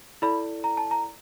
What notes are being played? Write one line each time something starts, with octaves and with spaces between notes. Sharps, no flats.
E4 A4 D5 B5
A#5
A5
A#5